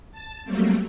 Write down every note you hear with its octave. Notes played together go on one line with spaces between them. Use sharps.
A5
F#3 G3 A3 A#3 C4